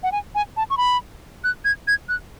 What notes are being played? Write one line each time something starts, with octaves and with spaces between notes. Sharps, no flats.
F#5
G#5
G#5
A5
C#6
B5
F#6
G#6
G#6
F#6